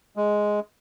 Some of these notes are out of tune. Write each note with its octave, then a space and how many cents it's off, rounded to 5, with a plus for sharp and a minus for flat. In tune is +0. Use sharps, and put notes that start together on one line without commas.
G#3 +5